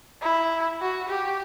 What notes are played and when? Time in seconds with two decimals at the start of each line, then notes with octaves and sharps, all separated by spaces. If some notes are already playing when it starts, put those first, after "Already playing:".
0.22 E4
0.81 F#4
1.09 G4